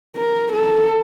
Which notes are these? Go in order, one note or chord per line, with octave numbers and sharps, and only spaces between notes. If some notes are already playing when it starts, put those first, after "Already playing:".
A#4
A4